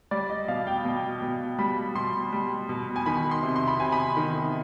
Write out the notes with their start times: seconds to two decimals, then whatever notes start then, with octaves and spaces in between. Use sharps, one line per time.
0.11 G3 D5
0.29 D#5
0.48 B2 F5
0.67 G5
0.85 B2
1.22 B2
1.58 G3 B5
1.95 B2 C6
2.32 G3
2.69 B2
2.96 G#5
3.06 D#3 B5
3.31 C6
3.43 C3
3.56 C6
3.68 B5
3.80 C3 G#5
3.92 B5
4.17 D#3